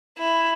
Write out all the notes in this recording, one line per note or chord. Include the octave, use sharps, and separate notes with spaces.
E4